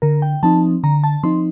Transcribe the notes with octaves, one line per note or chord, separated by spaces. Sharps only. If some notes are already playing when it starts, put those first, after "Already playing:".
D3 A#4
G5
F3 C4 D#4 A5
D3 A#5
A5
F3 C4 D#4 C6